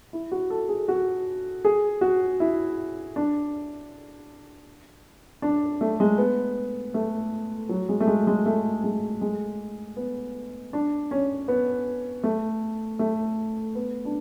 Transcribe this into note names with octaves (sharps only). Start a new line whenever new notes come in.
E4
F#4
A4
G#4
F#4
G#4
F#4
E4
D4
D4
A3
G#3
B3
A3
F#3
G#3
A3
G#3
G#3
A3
G#3
G#3
B3
D4
C#4
B3
A3
A3
B3
D4